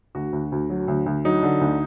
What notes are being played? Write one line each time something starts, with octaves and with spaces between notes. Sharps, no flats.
D2 F#4
D2
D2
F#3
D2
D2
F#3 D#4
D3
D2